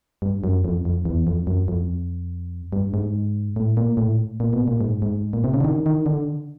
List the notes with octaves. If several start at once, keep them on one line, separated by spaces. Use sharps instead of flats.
G2
F#2
F2
F2
E2
F2
F#2
F2
G2
G#2
A2
A#2
A2
A#2
B2
A#2
G#2
G#2
A#2
C3
C#3
D3
D#3
D#3
D3